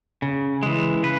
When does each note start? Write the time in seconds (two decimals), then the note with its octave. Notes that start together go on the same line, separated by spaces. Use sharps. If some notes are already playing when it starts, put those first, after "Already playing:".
0.22 C#3
0.63 E3 G#3
1.03 C#3 B4